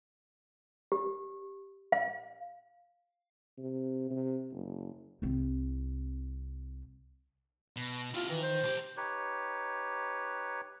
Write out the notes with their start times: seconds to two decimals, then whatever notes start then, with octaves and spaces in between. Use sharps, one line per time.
0.92 G4
1.92 F5
3.58 C3
4.11 C3
4.52 F#1
5.22 C2 C4
7.76 B2
8.14 E4 F4 G4
8.29 D#3 E3
8.42 C5
8.63 B1 G4
8.97 D#4 G4 B4 C#5